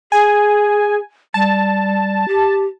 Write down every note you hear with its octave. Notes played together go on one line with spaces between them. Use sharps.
G#4 G#5
G3 A5
G4